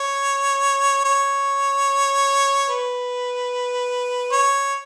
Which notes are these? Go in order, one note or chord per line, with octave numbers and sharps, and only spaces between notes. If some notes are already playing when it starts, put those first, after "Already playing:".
Already playing: C#5
C#5
B4
C#5